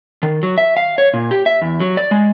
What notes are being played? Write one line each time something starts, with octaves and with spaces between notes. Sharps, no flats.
D#3
F#3
E5
F5
C#5
A#2
G4
E5
E2
F#3
D5
G#3